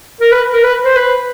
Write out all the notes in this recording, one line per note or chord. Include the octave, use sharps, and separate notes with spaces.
A#4
B4
A#4
B4
C5
B4